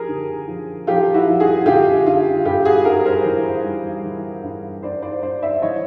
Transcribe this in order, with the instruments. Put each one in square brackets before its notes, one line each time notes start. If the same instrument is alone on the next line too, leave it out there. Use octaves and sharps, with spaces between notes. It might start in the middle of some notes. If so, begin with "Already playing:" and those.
Already playing: [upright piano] F3 G4 G#4 A#4
D3
F3
F3 F4 G4
E4 F#4
F3
F#4 G#4
D3 F4 G4
D3 F4
G2 F4 G4
F#4 G#4
G2 G#4 A#4
A#4 C5
E3
G3
E3
G2
G2 C5 D5
C5 D5
G2 C5 D5
D5 E5
E3 C#5 D#5